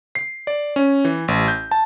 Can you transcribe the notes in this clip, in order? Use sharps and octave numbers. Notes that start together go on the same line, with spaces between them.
C7
D5
C#4
E3
A1
G6
A5